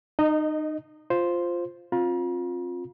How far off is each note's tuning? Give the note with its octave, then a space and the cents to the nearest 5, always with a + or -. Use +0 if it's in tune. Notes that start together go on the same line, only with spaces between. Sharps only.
D#4 -25 D#5 +0
F4 +0 C5 +0
C4 +30 F4 +20 A#5 +45